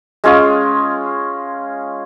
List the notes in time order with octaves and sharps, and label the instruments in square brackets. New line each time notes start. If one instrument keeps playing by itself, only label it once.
[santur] G#3 C#4 F4 G#4